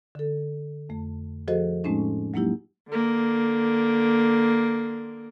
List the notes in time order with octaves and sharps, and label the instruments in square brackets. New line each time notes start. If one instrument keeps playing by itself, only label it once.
[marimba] D3 A4
F2 A3
F3 F#4 G#4 A4 C5 D#5
A2 G#3 A3 C4 C#4 D#4
F#3 G#3 A#3 D#4 E4 G4
[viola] D3 A#3